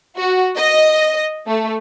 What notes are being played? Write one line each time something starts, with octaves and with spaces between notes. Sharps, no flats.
F#4
D#5
A3